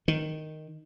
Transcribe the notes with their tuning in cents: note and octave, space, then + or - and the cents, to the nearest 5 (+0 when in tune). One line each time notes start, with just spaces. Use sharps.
D#3 -5